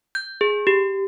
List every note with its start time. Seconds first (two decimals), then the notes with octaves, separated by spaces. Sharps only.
0.15 G6
0.41 G#4
0.67 G4